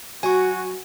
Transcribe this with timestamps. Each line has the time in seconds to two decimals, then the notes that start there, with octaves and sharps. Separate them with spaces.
0.23 F#3 F#4 G#5 C#6